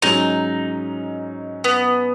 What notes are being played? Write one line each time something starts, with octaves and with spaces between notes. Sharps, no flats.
G#2 F#3 C#4 D#4
B3